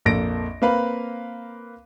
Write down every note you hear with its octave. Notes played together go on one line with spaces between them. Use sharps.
A#1 F2 A#3 A4 A#6 D7
A#3 C4 B4 F5 B5